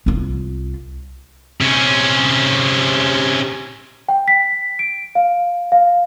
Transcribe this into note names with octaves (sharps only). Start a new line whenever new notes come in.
C2 F4
C3 C#4
G5
B6
D7
F5
F5